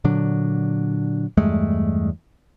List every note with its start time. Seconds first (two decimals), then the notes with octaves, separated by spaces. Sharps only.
0.04 A#2 D3 F#3 D4
1.37 E2 G2 G#3 A3